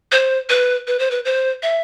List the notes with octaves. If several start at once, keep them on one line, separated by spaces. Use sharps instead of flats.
C5
B4
B4
C5
B4
C5
E5